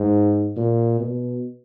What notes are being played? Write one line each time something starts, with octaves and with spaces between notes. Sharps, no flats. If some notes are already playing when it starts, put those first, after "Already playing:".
Already playing: G#2
A#2
B2